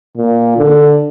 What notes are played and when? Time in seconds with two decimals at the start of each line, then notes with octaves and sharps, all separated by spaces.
0.17 A#2
0.57 D3